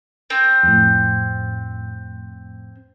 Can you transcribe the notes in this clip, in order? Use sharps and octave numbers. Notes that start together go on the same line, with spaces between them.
C4
F2 A2